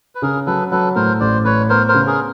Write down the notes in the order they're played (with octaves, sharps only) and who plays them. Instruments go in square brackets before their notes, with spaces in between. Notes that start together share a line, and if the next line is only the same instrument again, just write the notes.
[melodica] B4
[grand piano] C#3 [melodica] G#4 A#4
[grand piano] F#3 [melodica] A4 B4
[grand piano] F#3 [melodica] A4 B4
[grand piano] A2 [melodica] A#4 C5
[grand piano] A1 [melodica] C5 D5
[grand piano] A2 [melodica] B4 C#5
[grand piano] B3 [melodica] A#4 C5
[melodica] A#4 C5
[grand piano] C#3
[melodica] G#4 A#4